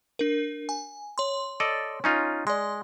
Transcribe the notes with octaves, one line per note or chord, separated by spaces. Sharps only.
D4 A#4
G#5
C#5 C6
A4 D5 D#5
C#4 D#4 F4
G#3 D5 C6